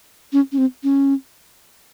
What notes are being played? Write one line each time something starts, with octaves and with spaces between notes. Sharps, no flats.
C#4
C#4
C4
C#4